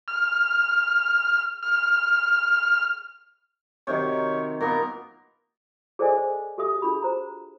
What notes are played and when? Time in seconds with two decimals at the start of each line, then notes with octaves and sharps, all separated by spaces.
0.08 F6
1.63 F6
3.87 C3 D#3 F#3 C#5
4.61 A#2 B3 A#4
5.99 G#4 A4 C5 D5 D#5 G#5
6.17 C5
6.58 F#4 G4 A4 E5 D#6
6.82 D4 F4 F#4 G#4 B5
7.02 C5 A#5